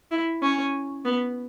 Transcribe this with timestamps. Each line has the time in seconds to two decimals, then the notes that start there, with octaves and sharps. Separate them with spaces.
0.11 E4
0.43 C#4
1.05 B3